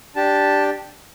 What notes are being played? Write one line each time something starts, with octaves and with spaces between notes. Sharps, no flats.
D4 G4 A5